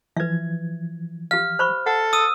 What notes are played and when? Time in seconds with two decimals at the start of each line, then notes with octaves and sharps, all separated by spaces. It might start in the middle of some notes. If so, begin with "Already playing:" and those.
0.17 E3 F3 B4 E5 G#6
1.31 G4 F5 F6
1.59 C5 B5 C#6
1.86 A4 F#5
2.13 D#6 E6 D#7